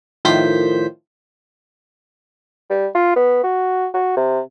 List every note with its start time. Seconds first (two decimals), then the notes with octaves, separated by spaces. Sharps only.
0.25 A2 D#3 F3 C5 G6 B6
2.70 G3
2.95 F4
3.16 B3
3.43 F#4
3.94 F#4
4.17 C3